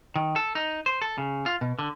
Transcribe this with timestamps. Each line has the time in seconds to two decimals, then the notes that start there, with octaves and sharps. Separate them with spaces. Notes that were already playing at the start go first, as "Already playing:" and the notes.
0.16 D#3
0.36 A4
0.55 D#4
0.86 C5
1.02 A4
1.18 C#3
1.46 F4
1.61 B2
1.79 D3